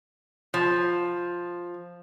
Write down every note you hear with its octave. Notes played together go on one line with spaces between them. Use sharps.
F3